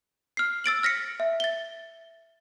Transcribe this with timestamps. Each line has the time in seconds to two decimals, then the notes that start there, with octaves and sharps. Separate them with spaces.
0.37 F6 C7
0.64 E6 A6 D7 F#7
0.83 F6 A#6 B6 C#7
1.20 E5
1.40 A6 G7